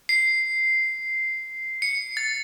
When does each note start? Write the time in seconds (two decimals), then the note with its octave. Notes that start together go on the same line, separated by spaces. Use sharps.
0.09 C7
1.82 C#7
2.17 A6